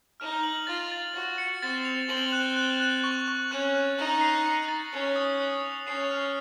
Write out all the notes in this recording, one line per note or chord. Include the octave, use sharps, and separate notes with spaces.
D#4 F6
F#7
F4 A6
A6
F#4 A6
C#7
C4 A6
F7
C4 F#7
F#6
F#6
F#6
C#6
C#6
C#4 F#6
F#6
D#4 F#7
C7
C#7
A6
C#4 C7
D#6
F#6
F7
C#4 C7
F6